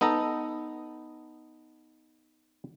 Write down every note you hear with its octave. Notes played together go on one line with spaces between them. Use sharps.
B3 D#4 A4 A#5